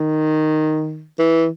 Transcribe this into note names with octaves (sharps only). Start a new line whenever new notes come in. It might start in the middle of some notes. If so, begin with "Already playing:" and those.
Already playing: D#3
E3